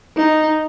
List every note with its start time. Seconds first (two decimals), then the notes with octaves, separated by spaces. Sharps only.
0.17 D#4